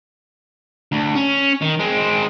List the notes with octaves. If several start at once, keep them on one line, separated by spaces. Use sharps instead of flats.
D2
C#4
D#3
G#3 C4